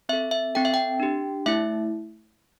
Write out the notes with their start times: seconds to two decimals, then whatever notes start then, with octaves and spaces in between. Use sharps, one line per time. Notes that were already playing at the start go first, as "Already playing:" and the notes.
0.09 C4 A4 E5
0.31 E5
0.55 C4 A4 G5
0.65 E5
0.74 G5
1.00 D4 G4
1.46 A3 E4 E5